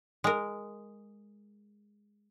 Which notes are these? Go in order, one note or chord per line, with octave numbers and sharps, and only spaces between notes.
G#3 A#4